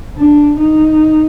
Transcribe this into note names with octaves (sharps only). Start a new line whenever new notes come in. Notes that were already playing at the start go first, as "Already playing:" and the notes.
D4
D#4